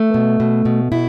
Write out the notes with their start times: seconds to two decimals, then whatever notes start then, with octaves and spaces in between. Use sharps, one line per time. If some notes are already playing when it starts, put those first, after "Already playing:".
Already playing: A3
0.14 B2
0.40 B2
0.65 B2
0.92 B2 E4